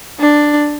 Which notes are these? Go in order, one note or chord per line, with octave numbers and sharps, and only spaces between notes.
D4